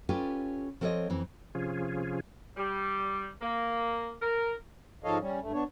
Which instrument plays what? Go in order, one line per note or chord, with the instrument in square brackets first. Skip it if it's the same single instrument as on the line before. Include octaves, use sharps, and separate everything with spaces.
[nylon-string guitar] C#4 F4 G4 A4 B4
F3 C4 A4 B4 C#5 D#5
F2 E3 C4
[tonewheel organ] C3 F3 C#4 F4 G#4
[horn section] G3
A#3
A#4
[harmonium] G#2 F3 A4 C#5 D#5 F5
G3 C#4
G2 A3
B3 D4 C#5